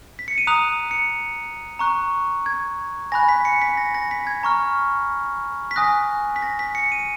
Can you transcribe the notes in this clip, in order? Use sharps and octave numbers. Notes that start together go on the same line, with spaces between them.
B6
C#7
D#7
A#5 D#6 F#6 F7
C#7
A#5 C#6 F#6
G#6
G#5 B5 F#6 A#6
B6
C#7
B6
A#6
A#6
B6
G#6
A#5 C#6 F6
B6
G#5 D#6 F#6 A#6
B6
A#6
B6
C#7
D#7